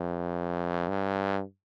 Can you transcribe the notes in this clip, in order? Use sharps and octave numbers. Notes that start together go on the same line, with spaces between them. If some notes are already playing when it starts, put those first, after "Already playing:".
Already playing: F2
G2